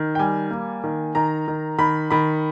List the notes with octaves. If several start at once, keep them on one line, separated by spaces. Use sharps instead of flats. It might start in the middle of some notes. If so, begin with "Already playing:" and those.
Already playing: D#3
G5
G3 G#5
A#3
D#3
D#3 A#5
D#3
D#3 B5
D#3 B5